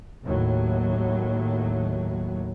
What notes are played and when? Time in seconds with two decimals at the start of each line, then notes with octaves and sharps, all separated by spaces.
0.23 D#2 A2 F#3